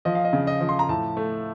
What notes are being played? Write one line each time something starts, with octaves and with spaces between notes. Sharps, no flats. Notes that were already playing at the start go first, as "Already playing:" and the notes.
F3 D#5
F5
D#5
C#3
D#5
F3
C6
A#5
A2 A5
A3